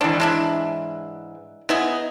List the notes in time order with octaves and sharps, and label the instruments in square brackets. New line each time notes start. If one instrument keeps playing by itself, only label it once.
[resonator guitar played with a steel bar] G#2 E3 [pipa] D4
[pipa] G#3 D4 E4
[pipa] B3 E4 G#4 [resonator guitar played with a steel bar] D#4